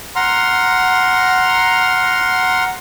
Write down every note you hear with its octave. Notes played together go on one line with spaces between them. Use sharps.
F#5 A#5 C6 F6